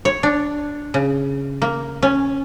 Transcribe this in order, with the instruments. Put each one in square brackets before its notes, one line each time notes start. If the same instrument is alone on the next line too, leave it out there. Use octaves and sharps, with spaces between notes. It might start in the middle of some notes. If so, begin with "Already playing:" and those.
[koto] C#5
D4
C#3
A#3
C#4